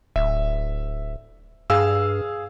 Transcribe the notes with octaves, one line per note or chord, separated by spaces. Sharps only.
D1 E5
G2 G#4 F5 E6